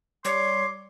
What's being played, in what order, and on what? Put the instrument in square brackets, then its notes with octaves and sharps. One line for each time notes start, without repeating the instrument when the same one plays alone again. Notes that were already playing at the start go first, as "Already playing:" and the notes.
[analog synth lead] G3 [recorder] C#5 [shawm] C6 [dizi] D6